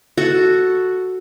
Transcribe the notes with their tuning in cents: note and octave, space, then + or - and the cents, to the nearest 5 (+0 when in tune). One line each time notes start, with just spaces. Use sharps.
F#4 +0 A4 +0